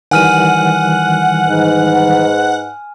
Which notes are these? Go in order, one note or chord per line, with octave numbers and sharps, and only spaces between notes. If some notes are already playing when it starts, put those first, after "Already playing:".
D#3 E3 G3 F#5 G#5 F6 D#7
G#2 D#4 B4